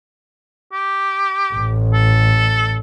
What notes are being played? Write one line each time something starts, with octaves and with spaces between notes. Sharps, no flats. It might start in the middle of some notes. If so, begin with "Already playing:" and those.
G4
A1
A4